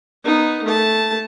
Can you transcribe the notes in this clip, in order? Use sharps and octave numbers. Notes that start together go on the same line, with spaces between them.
B3 D#4
A3 A5